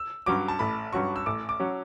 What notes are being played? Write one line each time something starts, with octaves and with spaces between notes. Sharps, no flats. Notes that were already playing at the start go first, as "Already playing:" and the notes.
Already playing: E6
G2 F#3 C#4 F#4 D6
A5
A1 B5
G2 F#3 C#4 F#4 C#6
E6
A1 D6
D6
F#3 C#4 F#4